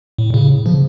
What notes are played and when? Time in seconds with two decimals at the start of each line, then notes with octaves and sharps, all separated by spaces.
0.18 A2
0.34 A2 C#3
0.66 C#3 F3